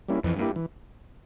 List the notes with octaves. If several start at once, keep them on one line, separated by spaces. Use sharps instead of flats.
G3 A#3 C#4 E4
F2 E3
G2
A#3 E4 G4
E3